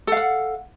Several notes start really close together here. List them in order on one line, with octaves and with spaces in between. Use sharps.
A4 F5 F#5